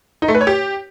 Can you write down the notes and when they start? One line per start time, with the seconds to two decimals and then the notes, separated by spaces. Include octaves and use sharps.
0.22 D#4
0.28 A3
0.35 B4
0.41 C#5
0.47 G4